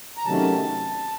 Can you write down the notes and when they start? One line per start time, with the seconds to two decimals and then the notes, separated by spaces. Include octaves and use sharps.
0.17 A#5
0.25 C3 D#3 F#3 A3 C#4 A5